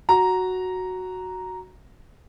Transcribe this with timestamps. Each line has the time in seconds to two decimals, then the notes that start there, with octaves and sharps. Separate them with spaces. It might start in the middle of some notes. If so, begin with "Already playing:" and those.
0.09 F#4 A#5